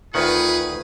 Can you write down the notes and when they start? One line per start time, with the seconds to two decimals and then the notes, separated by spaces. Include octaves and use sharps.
0.14 D2 D#3 F4 G#4 B4 F#5